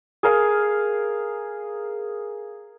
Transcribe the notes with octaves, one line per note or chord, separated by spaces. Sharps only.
G#4 A#4 F5